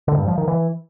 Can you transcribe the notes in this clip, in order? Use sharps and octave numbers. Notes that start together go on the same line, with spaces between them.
D3
G2
F3
D#3
E3